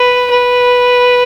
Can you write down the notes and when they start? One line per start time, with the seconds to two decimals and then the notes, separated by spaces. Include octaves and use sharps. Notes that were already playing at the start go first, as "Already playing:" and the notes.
Already playing: B4
0.31 B4